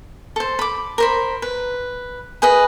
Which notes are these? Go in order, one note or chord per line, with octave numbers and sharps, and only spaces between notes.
A4 C5
B5 D6
A#4 C5 B5
B4
G#4 B4 D#5